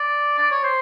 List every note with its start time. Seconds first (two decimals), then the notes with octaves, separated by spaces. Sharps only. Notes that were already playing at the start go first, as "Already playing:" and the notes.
Already playing: D5
0.38 D5
0.51 C#5
0.64 C5